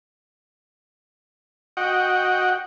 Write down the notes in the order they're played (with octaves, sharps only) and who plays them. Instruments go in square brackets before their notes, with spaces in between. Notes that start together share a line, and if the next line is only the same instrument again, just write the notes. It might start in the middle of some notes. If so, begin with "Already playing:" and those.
[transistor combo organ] F#4 D#5 F#5 G5